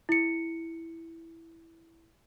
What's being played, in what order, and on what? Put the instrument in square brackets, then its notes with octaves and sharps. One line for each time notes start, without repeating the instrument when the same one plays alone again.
[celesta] E4 C#7